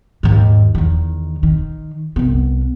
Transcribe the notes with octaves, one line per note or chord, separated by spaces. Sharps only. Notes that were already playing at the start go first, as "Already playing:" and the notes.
D#2 G#2
E2 D#3
D#3
C2 B3